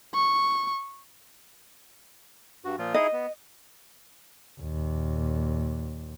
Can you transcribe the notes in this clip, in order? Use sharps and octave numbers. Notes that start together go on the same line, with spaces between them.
C#6
G2 F#4
A#2 F3 F4
D#4 E4 G#4 D#5
B3
D#2 A#2